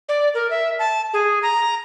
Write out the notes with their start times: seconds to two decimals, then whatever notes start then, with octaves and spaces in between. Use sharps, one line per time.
0.09 D5
0.34 A#4
0.51 E5
0.79 A5
1.13 G#4
1.43 A#5